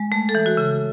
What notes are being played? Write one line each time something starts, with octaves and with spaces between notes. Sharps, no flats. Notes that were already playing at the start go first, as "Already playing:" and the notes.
Already playing: G#3
A3
A4
E3
F#4
C#3